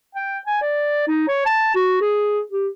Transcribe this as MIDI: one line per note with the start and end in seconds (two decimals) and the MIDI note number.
0.15 0.40 79
0.46 0.57 80
0.61 1.05 74
1.08 1.27 63
1.28 1.42 73
1.46 1.73 81
1.75 1.97 66
2.01 2.41 68
2.52 2.68 67